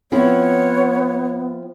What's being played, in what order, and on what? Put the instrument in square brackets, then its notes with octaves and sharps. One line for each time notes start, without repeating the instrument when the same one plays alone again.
[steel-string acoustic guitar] F3 C4 E4 [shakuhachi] B3 [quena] C#5